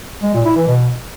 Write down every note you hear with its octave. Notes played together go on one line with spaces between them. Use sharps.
G#3
A#2
E4
E3
B2